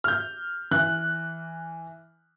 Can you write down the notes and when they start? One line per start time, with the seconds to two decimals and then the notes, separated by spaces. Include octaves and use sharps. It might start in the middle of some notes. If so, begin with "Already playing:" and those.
0.04 F6 G6
0.71 E3 F#6